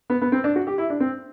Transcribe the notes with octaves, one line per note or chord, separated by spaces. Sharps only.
B3
B3
C4
D4
F#4
G4
E4
D4
C4